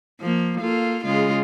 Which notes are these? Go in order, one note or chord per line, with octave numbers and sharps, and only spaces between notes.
F3 A#3
A#3 F4 A4
C#3 G#3 F4